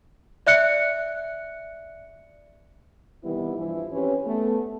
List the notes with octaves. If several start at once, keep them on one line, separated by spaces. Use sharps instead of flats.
D5 E5 F#6 C#7
C3 D#3 E3 G3 B3 E4
G2 E3 F3 E4
C4 C#4 G4 B4 C#5
A3 B3